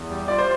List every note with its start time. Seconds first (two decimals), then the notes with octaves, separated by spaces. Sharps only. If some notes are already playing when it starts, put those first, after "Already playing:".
Already playing: E2
0.10 G3
0.28 F4 D5
0.38 C5